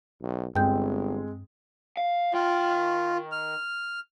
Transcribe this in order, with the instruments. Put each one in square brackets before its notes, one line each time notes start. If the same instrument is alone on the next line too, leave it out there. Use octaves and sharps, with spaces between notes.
[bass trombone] B1
[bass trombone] G1 [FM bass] G2 [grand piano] G#3 C4 [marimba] G5 G6
[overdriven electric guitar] F5
[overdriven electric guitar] D#3 G5 [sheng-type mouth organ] F4
[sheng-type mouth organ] F6